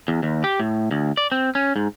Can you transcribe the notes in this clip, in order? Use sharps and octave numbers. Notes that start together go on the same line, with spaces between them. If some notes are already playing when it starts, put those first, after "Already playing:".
E2
D#2
G4
A2
D2
D5
C4
C#4
G#2